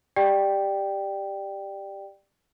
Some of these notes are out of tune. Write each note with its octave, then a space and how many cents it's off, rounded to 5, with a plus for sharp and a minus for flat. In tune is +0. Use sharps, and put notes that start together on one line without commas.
G4 +5 D5 +15 G5 +0